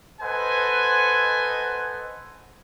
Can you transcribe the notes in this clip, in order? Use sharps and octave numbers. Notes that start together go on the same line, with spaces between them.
A4 B4 C5 D#5 F#5 G#5